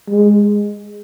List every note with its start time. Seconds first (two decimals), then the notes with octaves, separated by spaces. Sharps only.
0.09 G#3